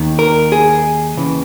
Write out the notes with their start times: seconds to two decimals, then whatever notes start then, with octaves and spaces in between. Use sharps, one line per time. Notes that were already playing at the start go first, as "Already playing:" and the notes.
Already playing: D#2 D#3
0.19 A#4
0.52 G#4
1.17 D#2 C#3 E3